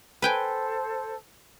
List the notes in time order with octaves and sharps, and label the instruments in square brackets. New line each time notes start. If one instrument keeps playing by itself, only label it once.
[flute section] A4 C5 [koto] B4 G5 G#5